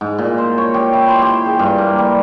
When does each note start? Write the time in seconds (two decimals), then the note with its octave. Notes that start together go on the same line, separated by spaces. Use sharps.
0.01 G#2
0.18 A#2
0.38 C5
0.58 C#5
0.74 G4
0.93 E4
1.08 C5
1.22 G4
1.46 G#4
1.59 G2
1.78 A#3
1.98 G3